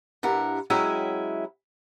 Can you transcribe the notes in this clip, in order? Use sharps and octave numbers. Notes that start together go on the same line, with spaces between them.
G2 E4 A#4 F#5
F#3 G#3 C#4 E4 E5 G5